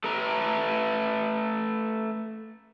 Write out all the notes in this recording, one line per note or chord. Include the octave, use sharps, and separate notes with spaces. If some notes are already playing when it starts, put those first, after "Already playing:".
A3 A4 B4 A#5